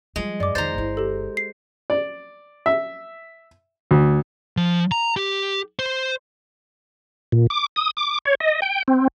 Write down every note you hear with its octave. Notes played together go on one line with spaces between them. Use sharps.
F3 G3 G#3
F#2 D5 D6
F2 D#3 C5 A#5 G6 A6
G1 E4
G4 A4
C7
D5
E5
D2
F3
A#5
G4
C5
A#2
D6
D#6
D6
C#5
D#5
G5
C4